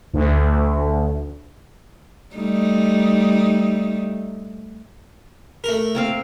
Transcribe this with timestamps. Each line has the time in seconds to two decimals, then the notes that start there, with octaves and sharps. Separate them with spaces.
0.13 D2
2.35 G3 A3 D#4
5.64 A3 A#4
5.95 A#3 C4 F5